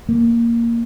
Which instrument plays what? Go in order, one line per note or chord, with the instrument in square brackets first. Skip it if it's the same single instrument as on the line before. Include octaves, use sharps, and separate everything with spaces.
[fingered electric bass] A#3